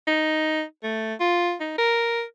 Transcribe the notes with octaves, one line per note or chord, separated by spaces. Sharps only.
D#4
A3
F4
D#4
A#4